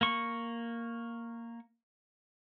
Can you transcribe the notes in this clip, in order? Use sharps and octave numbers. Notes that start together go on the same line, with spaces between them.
A#3 C#6